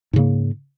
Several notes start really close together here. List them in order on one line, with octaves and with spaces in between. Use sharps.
G#2 C#3 A#3